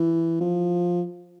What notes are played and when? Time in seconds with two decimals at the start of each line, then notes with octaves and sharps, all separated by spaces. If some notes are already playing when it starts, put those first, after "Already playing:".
Already playing: E3
0.41 F3